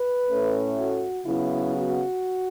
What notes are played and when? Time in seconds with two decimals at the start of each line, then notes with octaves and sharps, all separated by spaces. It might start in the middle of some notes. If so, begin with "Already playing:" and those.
Already playing: B4
0.30 A2 A3 C#4
0.77 F#4
1.26 C#3 F#3 B3 E4
1.74 F#4